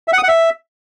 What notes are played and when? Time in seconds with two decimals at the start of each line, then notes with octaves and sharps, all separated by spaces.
0.08 E5
0.13 F#5
0.18 D#6
0.23 F#5
0.28 E5